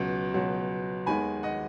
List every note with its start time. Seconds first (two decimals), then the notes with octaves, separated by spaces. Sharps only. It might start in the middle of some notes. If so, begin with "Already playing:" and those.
Already playing: C#2 B2 F#3 B3
0.34 C#2 B2 F#3 B3
1.06 D#2 D#3 G#3 B3 G#5 B5
1.43 D#5 F#5